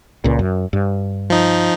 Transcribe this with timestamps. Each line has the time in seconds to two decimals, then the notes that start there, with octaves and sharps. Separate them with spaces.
0.24 C#2 A#2
0.39 F#2
0.73 G2
1.30 F3 D#4